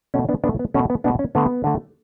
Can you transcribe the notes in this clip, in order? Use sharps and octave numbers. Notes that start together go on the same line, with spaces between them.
B2 A3 C#4
B3 D4
B2 A3 B3 D4
B3
B2 A3 C#4
B3
B2 A3 B3 D4
C#4
D3 A3 B3
D3 A3